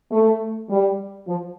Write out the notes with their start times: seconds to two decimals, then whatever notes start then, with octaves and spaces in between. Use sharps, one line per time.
0.11 A3
0.70 G3
1.27 F3